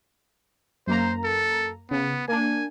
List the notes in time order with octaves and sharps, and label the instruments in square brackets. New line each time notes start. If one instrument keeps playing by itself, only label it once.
[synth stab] F#2 A#3 A#5 [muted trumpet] C5
[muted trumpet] A4
[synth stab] C#3 [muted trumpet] B3
[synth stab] A#3 D4 [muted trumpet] G#5